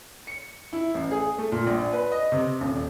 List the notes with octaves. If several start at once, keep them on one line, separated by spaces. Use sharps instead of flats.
C#7
E4
A1
G#4
A3
A#2
A#1
B4
D#5
C3
D#1